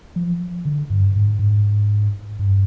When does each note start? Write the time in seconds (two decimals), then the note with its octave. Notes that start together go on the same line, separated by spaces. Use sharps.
0.16 F3
0.65 D3
0.90 G2
1.16 G#2
1.39 G#2
2.39 G2